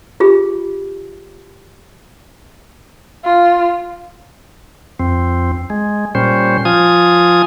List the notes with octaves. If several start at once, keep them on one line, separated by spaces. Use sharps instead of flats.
F4 G4 G#4
F4
F2 C4
G#3
A#2 G3 C#4 C5
F3 F4 G#5 D#6